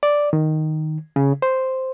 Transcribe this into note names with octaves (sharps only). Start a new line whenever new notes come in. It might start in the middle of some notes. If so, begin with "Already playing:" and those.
D5
D#3
C#3
C5